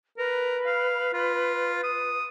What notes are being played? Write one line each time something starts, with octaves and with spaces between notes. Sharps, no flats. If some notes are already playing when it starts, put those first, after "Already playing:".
A#4 B4
F5
F4
D#6